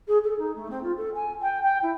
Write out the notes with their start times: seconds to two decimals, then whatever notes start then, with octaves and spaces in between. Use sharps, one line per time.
0.07 G#4
0.23 A4
0.38 D#4
0.55 A3
0.70 C4
0.83 F4
0.97 A4
1.14 G#5
1.42 G5
1.62 G5
1.82 E4